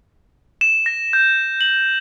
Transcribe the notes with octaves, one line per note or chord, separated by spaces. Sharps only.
E7
A#6
G6
F#7